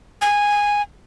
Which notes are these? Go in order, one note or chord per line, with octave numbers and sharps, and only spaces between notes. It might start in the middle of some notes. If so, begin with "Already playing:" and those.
G#5